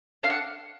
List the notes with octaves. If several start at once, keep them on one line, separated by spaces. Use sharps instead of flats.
D4 F5
F#5